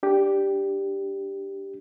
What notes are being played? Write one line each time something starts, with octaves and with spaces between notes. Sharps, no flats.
D4 G4